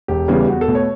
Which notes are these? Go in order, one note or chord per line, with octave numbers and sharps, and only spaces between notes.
E1 G4
E2 C#3 E3 G3
E2 F#4
A4
B2 A3
C#5